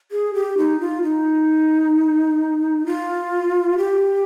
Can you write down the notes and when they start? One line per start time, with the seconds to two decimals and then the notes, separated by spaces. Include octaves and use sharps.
0.11 G#4
0.34 G4
0.57 D#4
0.80 F4
1.03 D#4
2.86 F4
3.78 G4